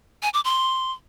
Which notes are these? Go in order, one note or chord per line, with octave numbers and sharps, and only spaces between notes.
G#5
D6
C6